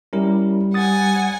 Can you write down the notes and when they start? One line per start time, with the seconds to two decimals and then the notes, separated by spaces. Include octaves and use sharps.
0.13 G3 C#4 E4 A#4
0.74 F#5 G#5 D#6 A6